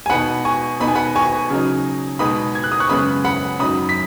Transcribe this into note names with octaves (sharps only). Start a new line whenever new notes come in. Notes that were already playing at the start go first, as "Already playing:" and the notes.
G#5
B2 B3 D#4 F#5 B5
G#5 C#6
B2 B3 D#4 B5
G#5
F#5 B5
G#5 C#6
C#3 F#3 D#4
B2 G#3 B3 D#4 B5 D#6
G#6
F#6
D#6
C#6 F#6
F#2 C#3 G#3 B3 B5 D#6
F#5 B5
F#2 F#3 D#4 B5 D#6
B6